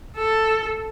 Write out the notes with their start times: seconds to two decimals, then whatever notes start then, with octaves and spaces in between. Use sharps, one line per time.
0.17 A4